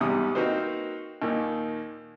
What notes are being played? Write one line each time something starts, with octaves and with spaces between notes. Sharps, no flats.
E2 G#2 C3 G3 D#6
A#3 C4 D#4 F#4 B4 C5
D#2 A#2 D#3